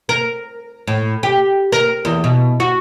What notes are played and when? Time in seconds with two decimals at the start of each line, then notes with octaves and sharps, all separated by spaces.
0.09 A#4
0.87 A2
1.23 G4
1.72 A#4
2.05 E2
2.24 B2
2.60 F#4